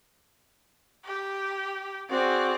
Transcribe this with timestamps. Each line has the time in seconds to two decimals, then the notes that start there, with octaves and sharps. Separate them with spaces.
1.05 G4
2.10 C4 F#4 G#4 D5